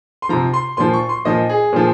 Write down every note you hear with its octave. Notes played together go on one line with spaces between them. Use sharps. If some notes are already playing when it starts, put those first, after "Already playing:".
C6
C3 F3 A#5
C6
A#2 F3 C6
C#6
C6
A#2 F3 D#5
G#4
A#2 F3